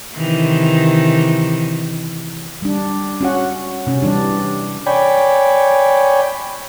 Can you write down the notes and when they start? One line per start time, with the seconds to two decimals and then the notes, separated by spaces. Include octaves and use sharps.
0.15 C3 D#3 E3
2.62 G3 D4
3.21 C#4 F#4 F#5
3.87 C3 C#4
4.02 E3 G3 D4
4.86 C#5 D5 G5 G#5 B5